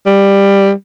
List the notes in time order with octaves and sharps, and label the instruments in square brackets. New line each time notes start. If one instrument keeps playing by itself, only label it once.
[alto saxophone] G3